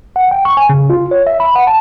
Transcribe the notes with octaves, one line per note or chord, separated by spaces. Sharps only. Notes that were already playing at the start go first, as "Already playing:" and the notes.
F#5
G5
C#6
G#5
C#3
F4
C#5
E5
B5
F#5
A5